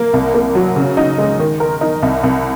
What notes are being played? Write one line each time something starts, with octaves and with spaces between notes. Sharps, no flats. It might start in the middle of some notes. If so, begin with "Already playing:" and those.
Already playing: A#3
C2
A#3
F#3
C#3
D#4
G#3
D#3
A#4
D#4
C2
C2